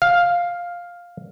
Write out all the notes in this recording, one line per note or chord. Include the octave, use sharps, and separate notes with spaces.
F5